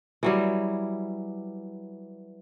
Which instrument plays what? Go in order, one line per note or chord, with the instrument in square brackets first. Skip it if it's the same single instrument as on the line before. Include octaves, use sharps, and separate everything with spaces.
[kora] E3 F#3 G3